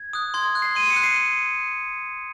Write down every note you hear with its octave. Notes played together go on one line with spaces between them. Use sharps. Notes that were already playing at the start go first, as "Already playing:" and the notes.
Already playing: G#6
D#6 F#6
C6 G#6
F#6
C7
C6 D#7
C#7
F#6
C7